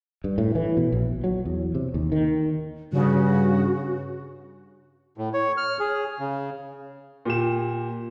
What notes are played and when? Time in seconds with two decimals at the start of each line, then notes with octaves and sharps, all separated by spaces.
0.24 G2
0.38 A2
0.55 E3
0.77 B2
0.92 A#1
1.24 F#3
1.45 E2
1.75 C3
1.94 D#2
2.12 D#3
2.93 G2 C#3 F#4
5.18 A2
5.34 C#5
5.57 F6
5.80 G#4
6.19 C#3
7.25 A#2 G4 E7